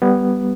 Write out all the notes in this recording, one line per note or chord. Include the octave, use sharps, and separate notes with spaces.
G3 B3